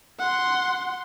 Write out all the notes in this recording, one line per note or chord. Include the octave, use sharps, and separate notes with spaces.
F#5 C6